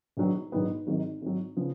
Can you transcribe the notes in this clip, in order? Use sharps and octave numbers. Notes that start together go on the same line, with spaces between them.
A#1 G#2 D#3 F#3 B3
A#1 G#2 D#3 F#3 B3
G#1 G#2 D#3 F#3
G#1 G#2 D#3 F#3
C#3 F3 B3